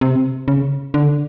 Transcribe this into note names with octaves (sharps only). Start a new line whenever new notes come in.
C3
C#3
D3